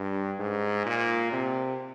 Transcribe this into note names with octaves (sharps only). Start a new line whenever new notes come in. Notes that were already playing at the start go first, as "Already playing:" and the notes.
Already playing: G2
G#2
A#2
C3